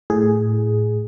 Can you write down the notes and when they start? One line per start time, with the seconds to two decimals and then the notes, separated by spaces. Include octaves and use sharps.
0.10 A2 G#4